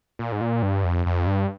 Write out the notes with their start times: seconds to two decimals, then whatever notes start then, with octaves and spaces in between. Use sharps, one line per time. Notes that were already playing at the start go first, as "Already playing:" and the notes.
0.19 A#2
0.32 G#2
0.41 A#2
0.63 G2
0.84 F2
1.06 F2
1.27 G2